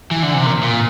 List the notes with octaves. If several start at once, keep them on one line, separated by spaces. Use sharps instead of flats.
E3
D3
C3
A#2
A#2